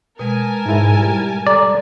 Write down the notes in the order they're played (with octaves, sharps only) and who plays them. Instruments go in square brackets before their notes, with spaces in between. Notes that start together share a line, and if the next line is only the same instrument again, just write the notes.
[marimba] B2 G#3 [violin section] A#4 G#5 A5
[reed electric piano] G#2 E4
G3
[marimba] A4 A#5 [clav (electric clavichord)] D5